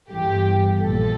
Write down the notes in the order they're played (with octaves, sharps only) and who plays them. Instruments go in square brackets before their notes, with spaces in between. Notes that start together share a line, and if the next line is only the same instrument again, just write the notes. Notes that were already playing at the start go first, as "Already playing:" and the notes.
[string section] G1 G2 E3 G4
A#1 A#2 F3 A4